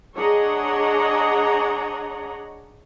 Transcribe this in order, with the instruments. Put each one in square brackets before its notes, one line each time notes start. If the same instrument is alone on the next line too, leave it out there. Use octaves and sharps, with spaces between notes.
[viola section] D4 G#4 C#5 D#5 F#5 A#5